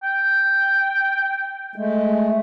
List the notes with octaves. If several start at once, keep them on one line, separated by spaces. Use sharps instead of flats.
G5
G#3 A3